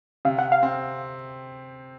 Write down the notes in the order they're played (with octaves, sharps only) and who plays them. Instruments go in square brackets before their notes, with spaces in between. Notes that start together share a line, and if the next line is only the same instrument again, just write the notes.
[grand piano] C3 [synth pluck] F5
[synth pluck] F#5
F5
[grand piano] C4